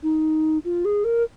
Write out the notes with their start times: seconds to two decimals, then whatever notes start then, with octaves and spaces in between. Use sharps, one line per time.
0.03 D#4
0.64 F4
0.85 G#4
1.04 A#4